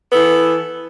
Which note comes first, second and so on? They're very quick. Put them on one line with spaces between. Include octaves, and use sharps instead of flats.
B3 A4 E3